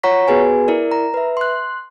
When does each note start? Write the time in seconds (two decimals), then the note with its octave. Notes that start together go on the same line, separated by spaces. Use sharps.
0.03 F4 C#5 F#5 A#5 C#6 B6
0.28 B3 F#4 G#4 B4 G#5
0.68 E4 A#4 D5
0.91 A#5
1.14 B4 E5
1.37 C6 F#6